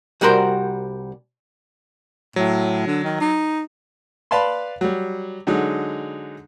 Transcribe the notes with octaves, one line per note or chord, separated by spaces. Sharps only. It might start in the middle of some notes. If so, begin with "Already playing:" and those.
C2 G3 F#4 A#4 C5
A2 F#3
D3
D#3
D#4
B4 D5 F5 A5 B5 C6
F#3 G3
D3 F#3 G#3 D#4